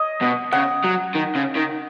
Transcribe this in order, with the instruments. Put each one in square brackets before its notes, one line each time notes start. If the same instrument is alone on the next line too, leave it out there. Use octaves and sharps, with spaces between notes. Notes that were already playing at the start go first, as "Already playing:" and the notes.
Already playing: [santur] C#5 D#5
[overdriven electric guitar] B2
[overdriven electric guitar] C#3 [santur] F#5
[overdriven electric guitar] F#3
D#3
C#3
D#3